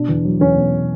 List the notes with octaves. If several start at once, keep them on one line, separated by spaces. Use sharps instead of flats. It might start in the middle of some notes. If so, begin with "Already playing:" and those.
Already playing: B2 D4
E2
F#3
E2 C#4
B2